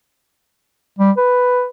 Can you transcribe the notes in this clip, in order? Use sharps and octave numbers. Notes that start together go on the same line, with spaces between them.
G3
B4